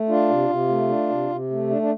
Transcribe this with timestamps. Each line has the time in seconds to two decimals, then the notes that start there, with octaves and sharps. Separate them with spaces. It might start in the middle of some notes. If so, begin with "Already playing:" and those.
Already playing: A3
0.09 D4 F4
0.29 C3
0.49 C3
0.69 A3
0.89 D4
1.09 C3
1.30 C3
1.51 A3
1.70 D4
1.82 D4